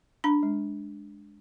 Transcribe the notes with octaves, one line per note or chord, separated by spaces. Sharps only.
D4 B5
G#3